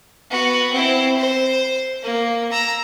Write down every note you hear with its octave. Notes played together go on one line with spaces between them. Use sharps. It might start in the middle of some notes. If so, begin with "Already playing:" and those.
B3 F#4
C4 E4
C5
A#3
A#5 E6